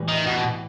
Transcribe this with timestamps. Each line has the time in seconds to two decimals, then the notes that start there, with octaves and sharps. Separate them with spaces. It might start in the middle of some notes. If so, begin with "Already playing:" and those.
Already playing: A2 E3 G3
0.08 D#3
0.26 B2